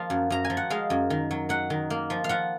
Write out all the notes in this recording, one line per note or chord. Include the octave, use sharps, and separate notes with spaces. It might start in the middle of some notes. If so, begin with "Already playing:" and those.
Already playing: F3 A#3 F5
F#2
F#2 A#5
G#5
F3
F#5
G#3 F5
F#2
D#3
F#3
F#3 F#5
D#3
A#3
F3
F5
F3 F#5